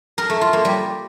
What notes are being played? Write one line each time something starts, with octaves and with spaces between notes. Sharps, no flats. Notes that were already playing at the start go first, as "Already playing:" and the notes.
A#4
A3
F4
A#3
G3